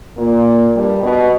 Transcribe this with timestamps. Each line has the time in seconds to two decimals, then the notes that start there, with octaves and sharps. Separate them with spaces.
0.18 A#2 A#3
0.74 G2 G3
1.03 B2